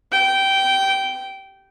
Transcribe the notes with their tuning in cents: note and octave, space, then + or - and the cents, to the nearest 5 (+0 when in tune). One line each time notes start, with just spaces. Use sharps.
G5 -15